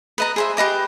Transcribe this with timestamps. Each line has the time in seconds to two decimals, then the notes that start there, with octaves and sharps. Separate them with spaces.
0.18 B4 D#5 A#5
0.36 G#4 C5 E5
0.57 G4 B4 D#5 D6